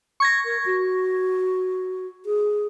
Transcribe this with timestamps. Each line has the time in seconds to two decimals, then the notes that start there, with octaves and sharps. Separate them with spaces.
0.20 C#6 G#6 A#6
0.45 A#4
0.66 F#4
2.26 G#4